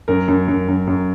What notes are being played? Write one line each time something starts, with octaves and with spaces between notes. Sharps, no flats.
F#2 A#4
F#2
F#2
F#2
F#2